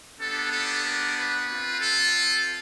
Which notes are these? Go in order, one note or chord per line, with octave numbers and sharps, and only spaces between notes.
B3 D4 G4 A4
A4
A#4
B4
C4 F4
A4